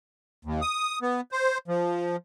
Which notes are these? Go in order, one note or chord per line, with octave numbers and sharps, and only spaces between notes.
D#2
D#6
B3
C5
F3